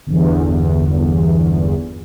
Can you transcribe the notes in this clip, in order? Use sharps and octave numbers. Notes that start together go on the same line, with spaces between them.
G1 E2